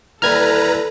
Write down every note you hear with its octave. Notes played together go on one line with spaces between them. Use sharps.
D#2 E3 G3 A4 B4 A#5 F6 G#6